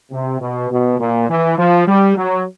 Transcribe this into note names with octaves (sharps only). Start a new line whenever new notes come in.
C3
B2
B2
A#2
E3
F3
G3
F#3